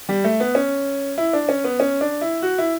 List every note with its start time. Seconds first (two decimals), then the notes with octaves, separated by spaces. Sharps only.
0.09 G3
0.24 A3
0.40 B3
0.55 C#4
1.18 E4
1.33 D4
1.49 C#4
1.64 B3
1.80 C#4
2.01 D4
2.21 E4
2.43 F#4
2.58 E4